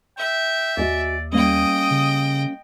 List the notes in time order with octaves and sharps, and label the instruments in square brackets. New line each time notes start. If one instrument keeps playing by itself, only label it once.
[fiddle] E5 [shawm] G5
[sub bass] D#2 [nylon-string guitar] F#4 D#5 G#5 [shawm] D5
[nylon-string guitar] G3 A#3 C#4 [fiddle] D#5 G5 [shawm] D#6
[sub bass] C#3